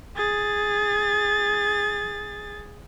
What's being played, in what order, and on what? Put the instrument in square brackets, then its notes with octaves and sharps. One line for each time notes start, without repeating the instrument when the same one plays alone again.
[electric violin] G#4 A6